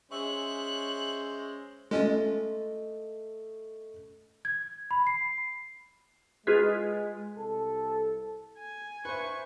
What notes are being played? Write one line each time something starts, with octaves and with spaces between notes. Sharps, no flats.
G#3 C#4 C5 E5 C#6 F#6
G#3 A3 C#4 F4 D#5
G#6
B5
C7
G#3 F4 G#4 B4
C2 A4
G#5
B4 C5 E5 C#6